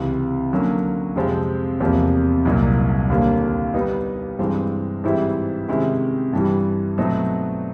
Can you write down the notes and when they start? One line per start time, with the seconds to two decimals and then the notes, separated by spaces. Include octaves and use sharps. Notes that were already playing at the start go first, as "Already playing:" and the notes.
Already playing: C#2 C3 E3
0.51 D3 F#3 A#3 C#4
1.16 F2 C3 F3 G#3 C4
1.80 E2 C3 F3 A#3
2.45 C2 A#2 F#3 A#3 D#4
3.10 D#2 D3 G3 A#3
3.74 G3 B3 D#4
4.39 G2 E3 G#3 C4
5.04 G#2 E3 G3 C4 E4
5.68 C3 D#3 G#3 C#4 E4
6.33 G2 E3 G3
6.98 B2 F#3 A3 C4 D#4